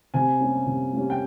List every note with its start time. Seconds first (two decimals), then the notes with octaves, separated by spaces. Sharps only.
0.14 C3 G#5
0.40 G3 A#3 C#4
0.67 C3
0.93 G3 A#3 C#4
1.10 G5